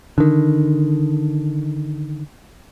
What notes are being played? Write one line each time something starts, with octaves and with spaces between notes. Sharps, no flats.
D3 D#3